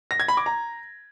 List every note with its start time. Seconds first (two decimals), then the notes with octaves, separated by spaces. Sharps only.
0.11 A#6
0.20 G#6
0.28 B5
0.37 D6
0.46 A#5